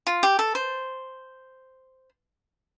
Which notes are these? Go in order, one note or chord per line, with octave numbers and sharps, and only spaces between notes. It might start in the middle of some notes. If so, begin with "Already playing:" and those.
F4
G4
A4
C5